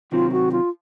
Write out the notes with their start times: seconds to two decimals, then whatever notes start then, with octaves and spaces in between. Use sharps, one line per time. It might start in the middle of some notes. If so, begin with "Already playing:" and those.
0.12 C3 D#3 F#3 C4 F4
0.32 F#4
0.52 F4